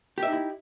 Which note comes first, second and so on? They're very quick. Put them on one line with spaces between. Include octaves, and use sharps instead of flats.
G4 E5 D#4 E4